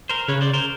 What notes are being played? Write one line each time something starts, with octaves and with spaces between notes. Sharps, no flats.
A#4 C5
C#3 B4 C#5
C5 D5
A#4 C5